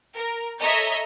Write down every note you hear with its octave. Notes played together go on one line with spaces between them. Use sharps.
A#4
A4 C#5 D#5 E5 A#5